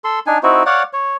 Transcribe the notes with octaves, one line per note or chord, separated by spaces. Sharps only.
A4 C6
D4 D#4 G#5
C4 D#4 E4 F#4
C#5 D5 F5 F#5
C#5